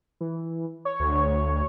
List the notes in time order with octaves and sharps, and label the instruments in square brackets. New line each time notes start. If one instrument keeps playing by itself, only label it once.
[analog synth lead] E3
C#5
[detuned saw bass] D2